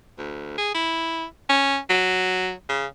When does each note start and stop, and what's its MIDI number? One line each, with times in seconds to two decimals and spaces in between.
0.18 0.58 38
0.58 0.73 68
0.75 1.25 64
1.49 1.78 61
1.90 2.52 54
2.69 2.86 49